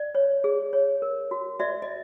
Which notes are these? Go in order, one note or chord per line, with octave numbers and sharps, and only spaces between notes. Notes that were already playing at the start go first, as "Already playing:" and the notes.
Already playing: D5
C#5
G#4
C#5
A#4
F#4
F#4 D5 E5
D#5